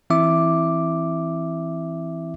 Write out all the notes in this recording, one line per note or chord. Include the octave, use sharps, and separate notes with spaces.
E3 C4 E4 E5 D6